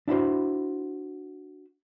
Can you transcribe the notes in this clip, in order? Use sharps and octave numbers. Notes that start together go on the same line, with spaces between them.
D4 E4 F#4 C5